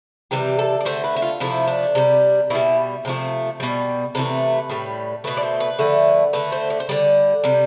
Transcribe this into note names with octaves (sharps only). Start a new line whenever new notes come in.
C3 E3 G3 G4
A4
D5
D3 A3 C5
B4
E4
F4
C3 F3 A3 E4
D4
C3 G3
B2 G3 E4
C3 F3 A3
B2 G3
C3 E3 A3 B4
A2 G3
B2 A3 B4
D5
C5
B4
D3 F3 A3
D3 A3 B4
C5
D5
C5
D3 G3 D5
C3 G3